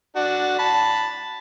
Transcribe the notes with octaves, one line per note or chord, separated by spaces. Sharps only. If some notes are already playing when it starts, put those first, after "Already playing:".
D4 F#4
A5 B5